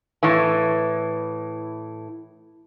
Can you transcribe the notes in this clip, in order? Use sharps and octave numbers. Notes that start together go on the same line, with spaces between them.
A2 E3